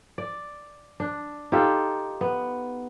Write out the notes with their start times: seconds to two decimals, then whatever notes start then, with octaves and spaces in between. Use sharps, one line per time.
0.18 D5
1.00 D4
1.52 D#4 F4 G4 A4
2.21 B3